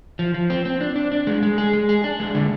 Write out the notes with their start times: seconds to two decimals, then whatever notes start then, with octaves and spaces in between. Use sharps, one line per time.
0.19 F3
0.34 F3
0.50 C4
0.65 C4
0.81 D4
0.96 D4
1.12 D4
1.27 G#3
1.43 G#3
1.58 G#4
1.73 G#3
1.89 G#4
2.04 D4
2.20 G#3
2.35 D3